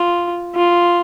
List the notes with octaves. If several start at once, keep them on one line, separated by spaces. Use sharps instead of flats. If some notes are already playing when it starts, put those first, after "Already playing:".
Already playing: F4
F4